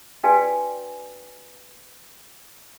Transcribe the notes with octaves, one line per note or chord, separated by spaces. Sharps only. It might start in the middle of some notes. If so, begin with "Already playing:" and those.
D4 F#4 B4 D5 G5 G#5